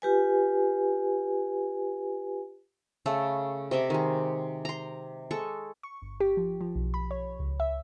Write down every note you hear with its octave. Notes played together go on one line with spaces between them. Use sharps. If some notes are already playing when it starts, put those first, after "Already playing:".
F4 G4 B4 G#5
C#3 A3 A4
C3 D#5 E5 D6
D#3 G#3
A#5 C6
G#3 A4 C#6
C#6
G1
G4
F3
F3
B1
B5
C#5
C#2
E5